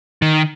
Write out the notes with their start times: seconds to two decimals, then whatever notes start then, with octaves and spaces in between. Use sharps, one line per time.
0.22 D#3